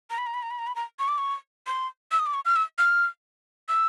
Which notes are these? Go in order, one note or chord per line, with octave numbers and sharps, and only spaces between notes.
A#5
B5
A#5
B5
A#5
B5
A#5
B5
A#5
C#6
D6
C#6
C6
E6
D#6
D6
C#6
F6
E6
F6
E6